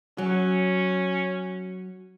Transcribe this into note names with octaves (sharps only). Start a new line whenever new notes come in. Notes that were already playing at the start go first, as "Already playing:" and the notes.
F#3 C#4